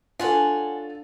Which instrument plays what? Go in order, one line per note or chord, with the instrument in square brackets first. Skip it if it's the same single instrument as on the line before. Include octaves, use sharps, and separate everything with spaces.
[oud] D4 [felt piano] F4 A4 [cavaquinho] C#5 F#5 G#5